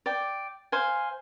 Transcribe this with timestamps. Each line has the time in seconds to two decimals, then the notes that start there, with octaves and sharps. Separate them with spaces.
0.06 D5 G5
0.72 C5 F5 G#5